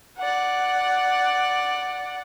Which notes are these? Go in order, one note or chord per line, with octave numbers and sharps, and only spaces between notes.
D5 F#5